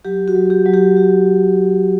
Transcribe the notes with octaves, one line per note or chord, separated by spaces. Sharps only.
F#3 G4
F#4
F#3
G4
F#3
G4
F#4